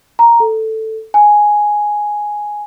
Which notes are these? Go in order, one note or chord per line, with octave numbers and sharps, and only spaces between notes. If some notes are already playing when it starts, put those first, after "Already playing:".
A#5
A4
G#5